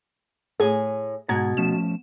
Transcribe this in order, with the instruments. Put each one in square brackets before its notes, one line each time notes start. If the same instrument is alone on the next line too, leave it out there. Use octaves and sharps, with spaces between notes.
[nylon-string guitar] A2 G#5 [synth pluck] G#4
[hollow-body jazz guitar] G#2 F#5 A#5 [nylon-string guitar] B2 [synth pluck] G#6
[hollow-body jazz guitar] F3 A3 C#4 [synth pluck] E7